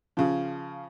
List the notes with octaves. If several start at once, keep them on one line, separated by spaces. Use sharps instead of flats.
C#3 F3